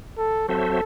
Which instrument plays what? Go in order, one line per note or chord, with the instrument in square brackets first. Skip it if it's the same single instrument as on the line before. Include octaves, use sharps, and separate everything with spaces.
[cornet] A4
[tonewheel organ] F#3 C4 F#4 C5 E5 [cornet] A4